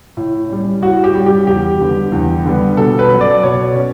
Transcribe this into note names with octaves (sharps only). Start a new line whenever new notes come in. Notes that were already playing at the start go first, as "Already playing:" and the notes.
A2
G3 C#4
A2 F#4
G4
G3 C#4
G4
E2 G4
D3 G3 B3
E2
D3 G3 B3
B2 A4
B4
F#3 C#4
D5
B2 C#5
C#4